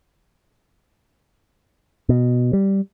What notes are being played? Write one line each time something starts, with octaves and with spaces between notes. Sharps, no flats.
B2
G3